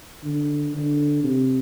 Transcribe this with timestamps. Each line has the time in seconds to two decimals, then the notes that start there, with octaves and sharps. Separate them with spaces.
0.24 D3
0.74 D3
1.24 C3